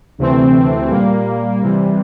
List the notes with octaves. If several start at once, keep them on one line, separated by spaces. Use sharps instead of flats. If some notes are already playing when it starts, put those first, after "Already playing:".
D2 C3 E3 A3 C4
A#2 G3 A#3
C3 E3 G3